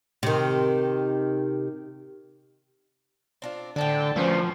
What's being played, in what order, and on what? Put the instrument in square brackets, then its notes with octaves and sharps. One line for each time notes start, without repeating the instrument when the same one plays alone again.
[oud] C3 D#3
[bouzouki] C4 D4 F4
[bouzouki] A2 C4 D5 [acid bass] D3 [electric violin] G5 A5
[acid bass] F3 [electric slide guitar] F#3 B4 C5 [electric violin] C#4